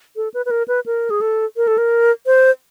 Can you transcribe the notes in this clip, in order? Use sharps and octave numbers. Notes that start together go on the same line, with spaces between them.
A4
B4
B4
A#4
B4
A#4
G#4
A4
A#4
A4
A#4
C5